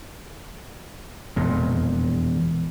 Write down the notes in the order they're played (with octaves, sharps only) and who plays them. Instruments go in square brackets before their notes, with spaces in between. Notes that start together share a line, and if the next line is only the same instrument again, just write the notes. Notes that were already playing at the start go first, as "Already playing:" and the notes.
[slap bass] E1 F2 A#2